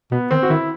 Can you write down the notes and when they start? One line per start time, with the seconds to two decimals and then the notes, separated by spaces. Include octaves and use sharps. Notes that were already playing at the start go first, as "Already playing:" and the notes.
0.12 B2 B3
0.31 D#3 C4
0.43 F#4
0.50 D#3 E4